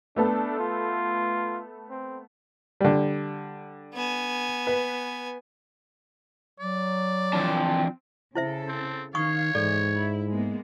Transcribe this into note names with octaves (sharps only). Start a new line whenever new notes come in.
A3 B3 D4 A4
F4
C4
D3 G3
B3 G#5
B4
F#3 D5
E3 F3 C4 D4 A5
C#3 E4 A4 C5 E5
C4
D#3 C#5 F5 C#6 D#6
G#2 E3 A4 D5
E4
G#3 A#3 B3